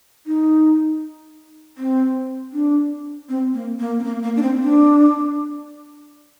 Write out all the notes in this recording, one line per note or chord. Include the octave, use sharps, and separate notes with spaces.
D#4
C4
D4
C4
A#3
A#3
C4
A#3
A#3
D4
C4
D4